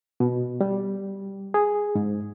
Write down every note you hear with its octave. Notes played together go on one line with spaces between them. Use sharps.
B2
G3
G#4
G#2